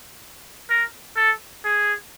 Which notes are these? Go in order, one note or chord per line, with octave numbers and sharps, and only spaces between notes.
A#4
A4
G#4